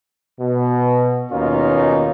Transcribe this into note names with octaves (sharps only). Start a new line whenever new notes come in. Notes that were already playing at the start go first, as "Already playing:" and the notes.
B2
D#2 B2 A#3 C#4 D#4 F4